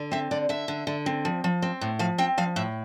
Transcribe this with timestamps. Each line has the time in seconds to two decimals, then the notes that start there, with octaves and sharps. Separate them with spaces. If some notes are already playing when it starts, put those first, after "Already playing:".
Already playing: D3
0.12 C4 E5
0.31 D3 D5
0.49 D3 E5
0.68 D3
0.87 D3
1.06 C4
1.25 F3
1.44 F3
1.62 C4
1.81 A2
1.99 F3 F5
2.18 C4 G5
2.38 F3 F5
2.56 A2 E5